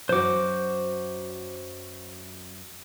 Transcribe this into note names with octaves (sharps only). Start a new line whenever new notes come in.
F#2 F#4 C5 D6